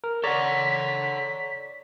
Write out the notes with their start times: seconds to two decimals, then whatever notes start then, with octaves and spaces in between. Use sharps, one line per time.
0.04 A#4
0.24 A4 C#5 D5 F#5 A#5 B6